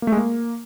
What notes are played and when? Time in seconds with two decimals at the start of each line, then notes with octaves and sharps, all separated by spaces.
0.02 A#3
0.07 A3
0.12 G#3
0.17 A#3